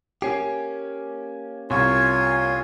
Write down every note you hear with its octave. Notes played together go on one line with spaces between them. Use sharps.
A#3 C#4 G4 G#5 C7
C2 F4 C#5 G#5 C#6